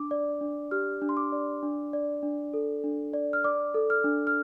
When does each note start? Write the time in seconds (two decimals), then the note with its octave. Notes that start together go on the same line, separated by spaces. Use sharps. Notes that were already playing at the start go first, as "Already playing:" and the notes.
Already playing: D4 D6
0.11 D5
0.41 D4
0.71 G4 F6
1.02 D4
1.09 C6
1.17 D6
1.32 D5
1.63 D4
1.93 D5
2.23 D4
2.54 A4
2.84 D4
3.13 D5
3.33 F6
3.44 D5 D6
3.74 A4
3.90 F6
4.04 D4
4.27 F6